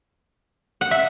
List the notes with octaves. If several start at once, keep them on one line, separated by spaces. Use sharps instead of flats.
F#5
E5